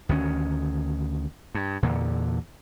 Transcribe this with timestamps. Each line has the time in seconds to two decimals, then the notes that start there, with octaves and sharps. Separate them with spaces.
0.09 D2 D#3 F3 C#4
1.55 G2
1.83 E2 A#2 D3